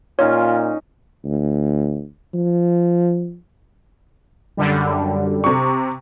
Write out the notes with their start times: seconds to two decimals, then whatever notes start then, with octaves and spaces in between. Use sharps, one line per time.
0.19 A#2 C#4 D#4 F4 C#5
1.25 D2
2.34 F3
4.57 F#2 D3 G3
5.44 C3 C#6